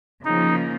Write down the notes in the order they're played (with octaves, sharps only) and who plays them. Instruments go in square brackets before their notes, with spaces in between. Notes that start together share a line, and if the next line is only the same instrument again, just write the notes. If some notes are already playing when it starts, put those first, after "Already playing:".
[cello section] C#3 F3 A#3 [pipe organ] D#4